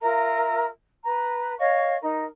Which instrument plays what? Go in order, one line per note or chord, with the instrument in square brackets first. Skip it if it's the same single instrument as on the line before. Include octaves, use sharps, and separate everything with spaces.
[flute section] F4 A#4 E5 A#5
B4 A#5
C#5 D#5 F5 C#6
D#4 A#4